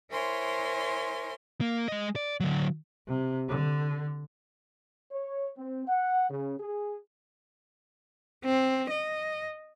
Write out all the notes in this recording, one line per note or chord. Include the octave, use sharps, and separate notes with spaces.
E4 A#4 C5 C#5 G#5 C6
A#3
G#3 D#5
D5
D3 F#3
C3
D3
C#5
C4
F#5
C#3
G#4
C4
D#5